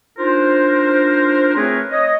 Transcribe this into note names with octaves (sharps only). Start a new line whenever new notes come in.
D4 D#4 F4 A#4 C5
A3 C4 G#4 A#4 B4 C#5
C#5 D#5